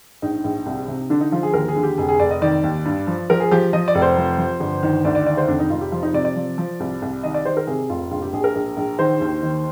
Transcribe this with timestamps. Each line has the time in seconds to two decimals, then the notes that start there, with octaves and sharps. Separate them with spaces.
0.22 A#1 D#4
0.44 A#1
0.66 C2
0.88 C3
1.10 D3 D4
1.21 D#4
1.32 F3 F4
1.43 G#4
1.53 D#2 A#4
1.68 G#4
1.76 D3
1.83 G4
1.98 F1 G#4
2.09 G#4
2.20 F1 D5
2.31 D#5
2.42 D#3 D5
2.64 D#2
2.85 G2
3.07 F3
3.30 F3 A#4
3.40 G#4
3.51 F3 G4
3.73 F3 D#5
3.88 D5
3.95 F1
4.02 C5
4.17 F3
4.38 F3
4.60 G1
4.83 D#3
5.05 D2 D5
5.15 D5
5.26 D#3 D5
5.37 C5
5.48 F1 D4
5.60 D#4
5.70 F1 F4
5.81 G4
5.92 F3 F4
6.03 D#4
6.14 C3 D5
6.25 D5
6.36 F3
6.58 F3
6.80 C2
7.02 C2
7.23 D#3 D#5
7.34 D5
7.45 D#3 C5
7.57 A#4
7.67 C3 G#4
7.89 F1 F4
8.11 A#1 F4
8.22 G4
8.33 A#1 G#4
8.44 A#4
8.55 A#1
8.77 A#1
8.99 D#3 C5
9.21 D#2
9.43 D#3